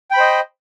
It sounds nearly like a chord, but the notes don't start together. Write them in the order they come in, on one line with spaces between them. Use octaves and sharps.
G5 B5 C5 D#5